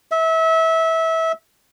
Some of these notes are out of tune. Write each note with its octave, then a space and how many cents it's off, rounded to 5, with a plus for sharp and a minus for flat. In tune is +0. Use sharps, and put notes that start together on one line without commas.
E5 -25